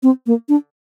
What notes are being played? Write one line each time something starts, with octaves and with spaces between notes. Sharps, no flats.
C4
A#3
D4